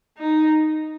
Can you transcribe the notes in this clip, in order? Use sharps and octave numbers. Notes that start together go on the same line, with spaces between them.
D#4